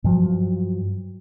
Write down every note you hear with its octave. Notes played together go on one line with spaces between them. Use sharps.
G2 F3 F#3